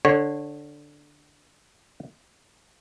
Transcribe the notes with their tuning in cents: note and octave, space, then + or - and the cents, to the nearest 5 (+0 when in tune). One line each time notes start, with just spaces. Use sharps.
D3 +0 C#5 -20